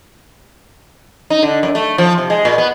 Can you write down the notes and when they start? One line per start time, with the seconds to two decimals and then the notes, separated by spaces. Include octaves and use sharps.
1.30 D#4
1.43 D3
1.63 F#2
1.75 A3
1.98 F3
2.18 C3
2.30 G#3
2.45 A#2
2.58 B3